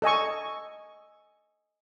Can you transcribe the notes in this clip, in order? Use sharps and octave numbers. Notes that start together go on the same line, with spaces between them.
A4 D#5 G#5 C#6